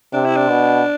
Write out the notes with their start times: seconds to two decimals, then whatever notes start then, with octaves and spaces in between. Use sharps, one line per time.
0.13 C3 D4
0.25 E4
0.36 D4
0.49 B2